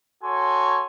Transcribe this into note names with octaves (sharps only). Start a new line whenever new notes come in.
F#4 A4 C#5 G#5 C6